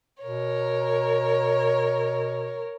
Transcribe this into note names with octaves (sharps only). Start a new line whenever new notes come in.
B2 A#4 C#5